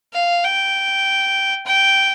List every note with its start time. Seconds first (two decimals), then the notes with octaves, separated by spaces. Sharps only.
0.13 F5
0.44 G5
1.66 G5